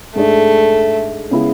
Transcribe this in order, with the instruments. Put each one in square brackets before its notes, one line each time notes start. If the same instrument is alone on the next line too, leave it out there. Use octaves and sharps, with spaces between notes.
[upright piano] G#2 G#3 D4 G#4 [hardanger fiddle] A3
[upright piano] C#3 G#3 B3 E4